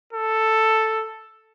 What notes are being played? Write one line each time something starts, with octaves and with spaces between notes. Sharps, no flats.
A4